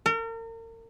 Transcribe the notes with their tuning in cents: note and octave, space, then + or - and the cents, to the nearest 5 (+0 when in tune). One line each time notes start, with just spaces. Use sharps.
A#4 -40